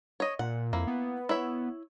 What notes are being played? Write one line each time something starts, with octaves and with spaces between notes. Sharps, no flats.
C#5 D#5
A#2 F#5
F2 A#3 E4
B3
E4 C#5 E5